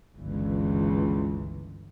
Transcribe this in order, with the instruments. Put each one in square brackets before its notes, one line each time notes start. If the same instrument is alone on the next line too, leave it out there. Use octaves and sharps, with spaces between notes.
[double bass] G1 E3 [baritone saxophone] C#2